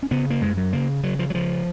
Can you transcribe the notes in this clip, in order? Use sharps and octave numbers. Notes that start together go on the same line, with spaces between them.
C#4
C#3 B3
A#3
F#2 G#3
F#3
C#3 A#3
C#3 F#3
F3
F#3
C#3 F3